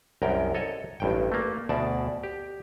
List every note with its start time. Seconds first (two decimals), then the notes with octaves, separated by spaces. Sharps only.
0.22 C2 F#2 A#4 G5
0.54 A4 C#5 D#5
1.00 A1 G2 G5
1.32 A3 A#3
1.69 D2 B2 D5 A5
2.23 G4